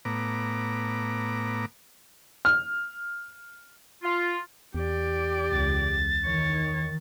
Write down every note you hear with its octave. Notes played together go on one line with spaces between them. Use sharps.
A2 B3 A#5 D6
F6
F4
E2 G4 D5
C#2 A6
D#3 C#5